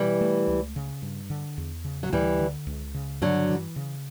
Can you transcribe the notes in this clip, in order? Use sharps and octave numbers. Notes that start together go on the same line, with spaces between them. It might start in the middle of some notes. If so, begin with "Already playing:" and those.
Already playing: B2 E3 G3
A3
C#2
C#3
G2
D3
E2
C#3
F#3
D2 E3 G3
D3
C#2
C#3
G2 D3 F#3
E3
C#3